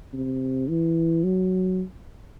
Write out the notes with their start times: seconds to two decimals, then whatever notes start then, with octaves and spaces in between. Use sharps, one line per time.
0.14 C3
0.69 E3
1.24 F#3